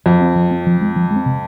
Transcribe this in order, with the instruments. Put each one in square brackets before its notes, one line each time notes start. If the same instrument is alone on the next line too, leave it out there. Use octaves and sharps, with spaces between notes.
[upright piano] F2 [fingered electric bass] F3
[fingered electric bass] C4
F3
C4
F3
G#3 C4
F3
G#3
C4
C3